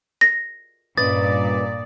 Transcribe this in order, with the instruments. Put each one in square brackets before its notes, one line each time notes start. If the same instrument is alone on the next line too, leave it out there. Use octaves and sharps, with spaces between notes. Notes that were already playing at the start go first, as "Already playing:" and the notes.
[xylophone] A#6
[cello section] G2 A#2 D5 [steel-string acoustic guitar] C#4 B4 D#5 [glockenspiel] D#6 A6